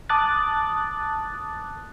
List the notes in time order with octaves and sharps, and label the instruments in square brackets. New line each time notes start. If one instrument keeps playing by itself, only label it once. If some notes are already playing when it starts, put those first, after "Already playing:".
[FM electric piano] A5 D6 D#6 F#6 A6